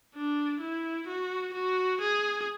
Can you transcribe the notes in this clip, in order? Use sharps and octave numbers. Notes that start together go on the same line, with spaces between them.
D4
E4
F#4
F#4
G#4